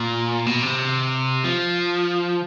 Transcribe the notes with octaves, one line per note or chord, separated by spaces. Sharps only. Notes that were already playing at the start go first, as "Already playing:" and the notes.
Already playing: A#2
B2
C3
F3